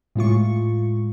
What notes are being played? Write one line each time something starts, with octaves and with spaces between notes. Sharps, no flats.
A2 G#3 F4 C#6